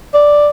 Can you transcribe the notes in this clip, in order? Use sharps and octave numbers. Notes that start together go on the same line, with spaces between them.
D5